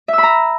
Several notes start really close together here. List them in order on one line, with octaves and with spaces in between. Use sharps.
E5 E6 B5 A#5